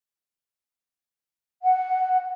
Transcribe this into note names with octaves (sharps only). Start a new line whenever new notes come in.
F#5